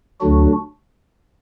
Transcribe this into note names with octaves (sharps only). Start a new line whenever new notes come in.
D2 D3 F#3 D4 F#4